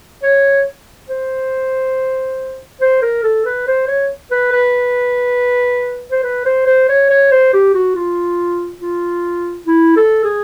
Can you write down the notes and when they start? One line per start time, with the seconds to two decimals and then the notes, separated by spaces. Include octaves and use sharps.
0.23 C#5
1.09 C5
2.81 C5
3.02 A#4
3.24 A4
3.46 B4
3.67 C5
3.88 C#5
4.31 B4
4.52 B4
6.12 C5
6.23 B4
6.45 C5
6.66 C5
6.89 C#5
7.10 C#5
7.31 C5
7.53 G4
7.75 F#4
7.95 F4
8.81 F4
9.67 E4
9.96 A4
10.24 G#4